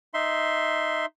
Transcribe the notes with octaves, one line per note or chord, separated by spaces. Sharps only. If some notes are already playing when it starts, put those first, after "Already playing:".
D#4 E5 C6